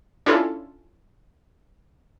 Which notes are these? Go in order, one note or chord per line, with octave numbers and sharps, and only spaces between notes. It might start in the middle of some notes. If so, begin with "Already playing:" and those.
C#4 D4 E4 F4 A4